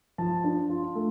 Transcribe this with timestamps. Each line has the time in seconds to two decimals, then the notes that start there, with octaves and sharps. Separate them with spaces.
0.18 F3 A5
0.44 D4
0.69 F4
0.95 A3